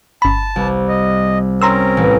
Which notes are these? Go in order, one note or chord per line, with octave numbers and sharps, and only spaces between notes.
G1 A5 B5
C2
D#5
C4 C#4 A#4 A#5 C6 E6
A1